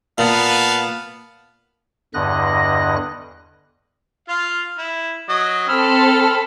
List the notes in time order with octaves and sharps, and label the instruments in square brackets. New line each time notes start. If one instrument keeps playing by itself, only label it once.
[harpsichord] A#2 [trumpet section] B3 F5 A5
[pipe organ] E2 G2 D3 D#5 F#6 A#6
[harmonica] F4 F5
E4
F#3 D#5
[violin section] C4 A4 [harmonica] B5 E6 F6